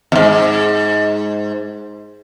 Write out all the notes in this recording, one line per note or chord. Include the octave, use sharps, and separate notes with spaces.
F2 G#2